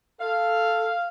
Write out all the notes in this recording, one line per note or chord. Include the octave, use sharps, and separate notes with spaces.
A4 F5